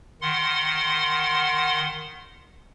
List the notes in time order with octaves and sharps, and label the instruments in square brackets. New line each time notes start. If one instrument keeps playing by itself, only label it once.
[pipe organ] D#3 F#5 C6